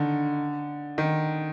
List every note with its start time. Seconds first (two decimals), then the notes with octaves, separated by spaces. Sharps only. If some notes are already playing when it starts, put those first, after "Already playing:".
Already playing: D3 D#3
0.98 D#3